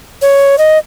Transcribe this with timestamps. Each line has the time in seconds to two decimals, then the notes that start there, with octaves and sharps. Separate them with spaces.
0.22 C#5
0.58 D#5